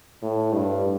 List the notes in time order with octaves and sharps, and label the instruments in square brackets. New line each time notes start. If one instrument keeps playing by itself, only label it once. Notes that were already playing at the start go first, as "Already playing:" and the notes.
[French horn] A2
G2